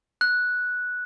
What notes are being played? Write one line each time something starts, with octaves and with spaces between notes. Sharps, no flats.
F#6